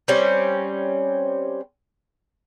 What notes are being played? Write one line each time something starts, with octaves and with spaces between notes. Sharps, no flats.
G3 C4 C#4